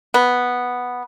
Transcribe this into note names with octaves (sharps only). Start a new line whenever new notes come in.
B3